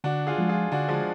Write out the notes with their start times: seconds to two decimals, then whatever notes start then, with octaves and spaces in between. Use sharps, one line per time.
0.04 D3 D4 F#4
0.27 F4 G#4
0.38 F3 G#3
0.49 F4 G#4
0.72 D3 D4 F#4
0.89 F3 G#3